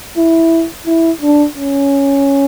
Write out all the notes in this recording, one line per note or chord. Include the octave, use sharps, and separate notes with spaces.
E4
E4
D4
C#4